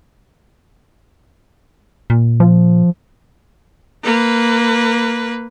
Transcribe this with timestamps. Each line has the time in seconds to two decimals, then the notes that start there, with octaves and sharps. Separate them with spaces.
2.10 A#2
2.40 F3
4.04 A#3 B4